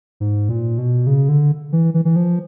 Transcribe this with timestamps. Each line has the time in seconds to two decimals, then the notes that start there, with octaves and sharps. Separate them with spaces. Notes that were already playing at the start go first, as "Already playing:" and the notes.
0.20 G#2
0.49 A#2
0.78 B2
1.07 C#3
1.29 D3
1.72 E3
1.94 E3
2.05 E3
2.16 F3